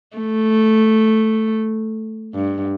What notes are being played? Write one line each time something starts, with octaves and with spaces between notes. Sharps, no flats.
A3
G2